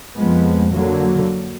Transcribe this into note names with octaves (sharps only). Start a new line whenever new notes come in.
F2 F3 G#3 B3
D3 F#3 A#3